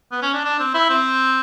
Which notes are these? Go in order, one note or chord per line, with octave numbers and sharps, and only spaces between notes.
B3
C#4
D4
D4
C4
E4
C4